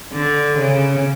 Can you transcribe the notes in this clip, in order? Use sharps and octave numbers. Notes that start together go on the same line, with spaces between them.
D3
C#3